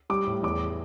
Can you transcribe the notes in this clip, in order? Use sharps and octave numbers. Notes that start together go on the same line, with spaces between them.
G3 D6
A2
E2 D6